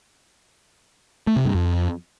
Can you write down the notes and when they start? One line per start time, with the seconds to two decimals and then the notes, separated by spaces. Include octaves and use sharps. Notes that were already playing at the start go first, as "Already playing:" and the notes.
1.27 A3
1.36 C3
1.45 G2
1.54 F2